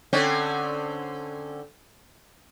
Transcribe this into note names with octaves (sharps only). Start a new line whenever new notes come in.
D3 C4 C#4